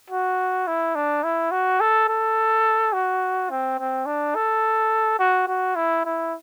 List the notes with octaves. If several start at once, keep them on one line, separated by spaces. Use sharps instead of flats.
F#4
E4
D4
E4
F#4
A4
A4
F#4
C4
C4
D4
A4
F#4
F#4
E4
E4